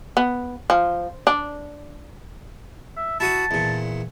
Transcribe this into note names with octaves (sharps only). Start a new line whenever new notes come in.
B3
F3
D4
E5
E4 F#4 A5 D#6
E2 A#2